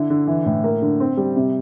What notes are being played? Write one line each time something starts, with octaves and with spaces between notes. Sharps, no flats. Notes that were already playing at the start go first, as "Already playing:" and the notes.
Already playing: D3 E4
D3
E3
A2
A#3
D3
C4
G3
C3